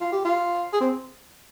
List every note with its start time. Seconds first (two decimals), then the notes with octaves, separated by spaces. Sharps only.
0.01 F4
0.12 G4
0.25 F4
0.73 G#4
0.80 C4